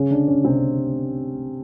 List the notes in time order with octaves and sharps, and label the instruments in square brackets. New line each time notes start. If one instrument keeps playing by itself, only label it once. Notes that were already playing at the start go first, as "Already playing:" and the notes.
Already playing: [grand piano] C#3 C#4
D3 D4
C#3 C#4
C3 C4